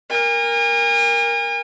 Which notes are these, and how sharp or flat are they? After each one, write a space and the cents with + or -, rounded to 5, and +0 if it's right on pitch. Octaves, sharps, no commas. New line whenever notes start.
A#4 +0 G#5 -40